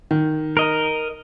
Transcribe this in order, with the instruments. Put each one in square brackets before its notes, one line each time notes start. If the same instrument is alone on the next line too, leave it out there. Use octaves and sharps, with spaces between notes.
[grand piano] D#3
[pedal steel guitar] A#4 D#5